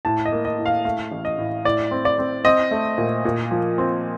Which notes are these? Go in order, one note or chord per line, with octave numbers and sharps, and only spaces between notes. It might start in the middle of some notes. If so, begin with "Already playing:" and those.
A2 A5
D#5
A#3
D#5
A2
F5
A3 F5
A1
D#5
A2
A2 D5
C4
D5
C4
C4 D#5
A3
A#2
A#2
F3
C4